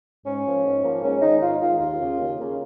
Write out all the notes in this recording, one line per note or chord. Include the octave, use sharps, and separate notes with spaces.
G#2 C#4
F3 A#3
G#2
F3 A#3
G#2 C#4
D#3 G#3 D#4
G#2 F4
D#3 G#3 F4
D#2 F4
C#3 A#3
D#2
C#3 A#3